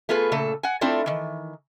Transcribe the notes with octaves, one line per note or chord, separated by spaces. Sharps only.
A3 B3 F4 G#4 B4
A#2 C#3 A3 A4
F#5 G#5
A3 C4 D4 E4 F4 A4
D#3 E3